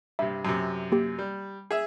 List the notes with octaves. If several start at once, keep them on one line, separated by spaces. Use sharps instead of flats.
G2 C3 E5
F#2 C3
A#3 G4
G3
G#4 E5